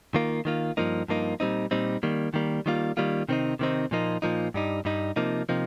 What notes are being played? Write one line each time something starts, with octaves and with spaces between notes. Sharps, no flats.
D#3 A#3 F4
D#3 A#3 F4
G2 F3 A#3 D#4
G2 F3 A#3 D#4
A#2 G3 C4 D#4
A#2 G3 C4 D#4
D#3 G3 A#3
D#3 G3 A#3
D#3 G3 A#3 F4
D#3 G3 A#3 F4
C3 D#3 C4 D#4
C3 D#3 C4 D#4
A#2 F3 A#3 D#4
A#2 F3 A#3 D#4
G2 G3 D#4
G2 G3 D#4
C3 F3 A#3 D#4
C3 F3 A#3 D#4